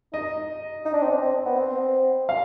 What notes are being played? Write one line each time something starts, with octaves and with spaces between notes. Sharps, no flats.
D#4 D#5
D#4
D4
C4
D4
C4
B3
C4
F5